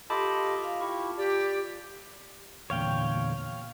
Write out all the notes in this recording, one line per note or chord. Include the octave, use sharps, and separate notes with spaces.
F4 G4 A4 D#5 A5 B5 D6
F4 F5
E4 F4 G4 C#6
G4 D5
E2 A#2 D3 C#5 F5 G5